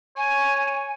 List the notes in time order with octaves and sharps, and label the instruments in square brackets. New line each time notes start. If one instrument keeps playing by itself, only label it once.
[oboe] C#5 [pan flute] G#5